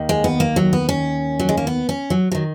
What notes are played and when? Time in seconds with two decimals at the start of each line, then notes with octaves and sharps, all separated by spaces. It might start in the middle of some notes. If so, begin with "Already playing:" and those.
Already playing: D#2 D#3
0.09 G#3
0.24 B3
0.40 A#3
0.56 F#3
0.73 B3
0.89 C#4
1.39 F#3
1.49 G#3
1.57 A#3
1.67 B3
1.89 C#4
2.10 F#3
2.32 D#3 F#3